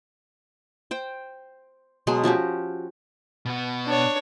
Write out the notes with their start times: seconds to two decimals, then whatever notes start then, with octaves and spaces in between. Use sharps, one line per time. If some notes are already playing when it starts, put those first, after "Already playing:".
0.91 C5 G5
2.07 B2 F#3 G#3 C6
2.24 F3 C#4 F#4 G4
3.45 B2 F#4
3.86 D4 C#5